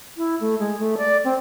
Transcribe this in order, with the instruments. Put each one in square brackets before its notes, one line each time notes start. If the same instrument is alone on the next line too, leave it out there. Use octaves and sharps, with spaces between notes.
[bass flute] E4
A3
G#3
A3
D5
C4